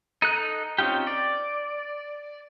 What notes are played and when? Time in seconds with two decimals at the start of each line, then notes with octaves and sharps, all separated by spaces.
0.22 D#4 A4 F#6
0.78 C4 C#4 D#4 F4 G4
1.07 D5